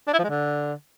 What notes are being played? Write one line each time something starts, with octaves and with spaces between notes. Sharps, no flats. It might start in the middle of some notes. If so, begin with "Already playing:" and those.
D4
E4
F3
G#3
D3